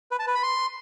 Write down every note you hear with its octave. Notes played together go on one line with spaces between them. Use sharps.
B4
A5
B4
B5
C6